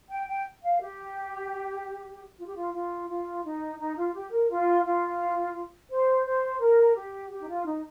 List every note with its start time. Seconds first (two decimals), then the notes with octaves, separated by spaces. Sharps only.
0.10 G5
0.27 G5
0.62 F5
0.80 G4
2.38 F4
2.47 G4
2.55 F4
2.73 F4
3.08 F4
3.43 D#4
3.79 D#4
3.96 F4
4.13 G4
4.31 A#4
4.49 F4
4.84 F4
5.90 C5
6.25 C5
6.60 A#4
6.95 G4
7.30 G4
7.40 D#4
7.48 F4
7.65 D#4